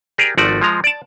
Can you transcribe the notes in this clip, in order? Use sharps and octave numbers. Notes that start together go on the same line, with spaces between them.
G4 G#4 A#4 D5
G#1 F3 A3 F#4 D5
F3 G#3 A#5
D5 A5